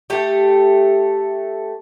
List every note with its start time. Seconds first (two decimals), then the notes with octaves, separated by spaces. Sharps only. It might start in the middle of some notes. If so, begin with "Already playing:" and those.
0.10 A3 G4